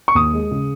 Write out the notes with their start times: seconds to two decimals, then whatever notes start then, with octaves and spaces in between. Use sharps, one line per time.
0.08 C#6
0.15 D#2 D#6
0.33 G#3
0.51 C#3